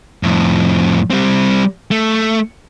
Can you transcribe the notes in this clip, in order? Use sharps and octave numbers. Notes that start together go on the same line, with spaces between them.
F2 A2
G3 C4
A3